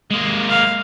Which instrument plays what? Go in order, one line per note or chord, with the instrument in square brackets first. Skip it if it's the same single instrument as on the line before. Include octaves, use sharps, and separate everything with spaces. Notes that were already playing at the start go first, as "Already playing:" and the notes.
[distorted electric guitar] G#3 A#3
[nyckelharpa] F5